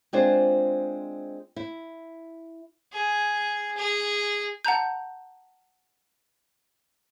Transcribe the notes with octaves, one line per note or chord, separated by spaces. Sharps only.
G#3 C4 D4 F4 G#4 C5
E4
G#4
G#4
F#5 A5 A#5 G6